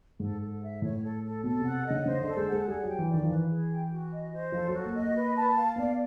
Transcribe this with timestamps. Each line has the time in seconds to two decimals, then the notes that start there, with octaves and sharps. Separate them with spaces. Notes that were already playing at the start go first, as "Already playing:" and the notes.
0.20 G#2 A4
0.41 A4
0.62 E5
0.82 A2 C#5
1.03 A4
1.23 A4
1.44 B2 A4
1.59 C3 F#5
1.85 C#3 D#5
2.06 C#3 C5
2.21 D3 A4
2.37 G#3
2.46 F#5
2.52 G#3
2.67 G3 G#4
2.83 F#3
2.88 G5
2.99 E3
3.08 D5
3.14 D#3
3.23 F3
3.29 E3 B4
3.50 G#4
3.71 G5
3.90 F#4
4.12 D#5
4.33 C5
4.52 F3 A4
4.68 F#3
4.73 F#4
4.84 A#3
4.94 D#5
4.99 A#3
5.14 B4
5.35 A5
5.56 F5
5.76 B3 D5